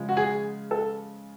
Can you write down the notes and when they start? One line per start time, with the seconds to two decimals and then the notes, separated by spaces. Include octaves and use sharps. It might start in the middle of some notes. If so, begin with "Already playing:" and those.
Already playing: C#3 F3 G#3
0.09 F#4
0.17 G#4
0.71 A4